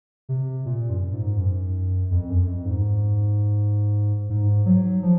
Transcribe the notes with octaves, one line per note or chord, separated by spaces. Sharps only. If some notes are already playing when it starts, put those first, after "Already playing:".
C3
A#2
F#2
G#2
F#2
F2
F#2
F2
G#2
G#2
F#3
F3